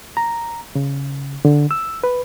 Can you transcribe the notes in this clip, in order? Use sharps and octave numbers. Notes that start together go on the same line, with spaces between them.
A#5
C#3
D3
E6
B4